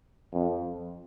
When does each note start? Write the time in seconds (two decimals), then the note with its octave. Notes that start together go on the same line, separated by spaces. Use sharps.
0.33 F2